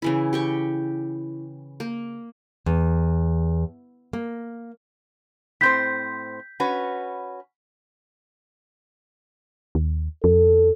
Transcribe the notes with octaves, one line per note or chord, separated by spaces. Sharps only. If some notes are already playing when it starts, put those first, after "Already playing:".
C#3 E3 E4
G4 G5 C#6
A#3
E2
A#3
A2 C4 C5 G6 B6
C#4 F#4 B4
D#2
F2 A4